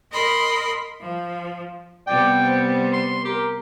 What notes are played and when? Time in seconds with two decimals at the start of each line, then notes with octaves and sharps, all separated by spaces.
0.11 A#4 D#5 B5 C6
1.01 F3
2.07 C3 G3 B3 D5 G5
2.44 C5
2.93 C6
3.25 G4 A#4